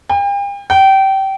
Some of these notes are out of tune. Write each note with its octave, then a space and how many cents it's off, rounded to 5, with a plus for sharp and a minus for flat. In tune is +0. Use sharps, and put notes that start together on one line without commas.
G5 +40
G5 -25